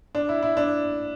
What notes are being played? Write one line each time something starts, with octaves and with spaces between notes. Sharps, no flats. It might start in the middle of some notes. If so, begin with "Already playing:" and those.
D4
E4
E4
D4